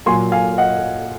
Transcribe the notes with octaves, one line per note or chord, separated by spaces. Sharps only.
A#2 F#3 A#3 G#5 C6
F5 G#5
D#5 F#5